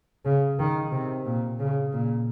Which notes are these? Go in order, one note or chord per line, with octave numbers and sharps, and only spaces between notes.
C#3
D#3
C3
A#2
C#3
A#2